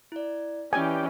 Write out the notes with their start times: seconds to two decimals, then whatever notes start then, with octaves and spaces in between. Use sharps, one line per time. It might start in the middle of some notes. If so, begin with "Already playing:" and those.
0.12 E4 D5
0.73 E3 C#4 G4 B4 D5 D#5 G5 G#5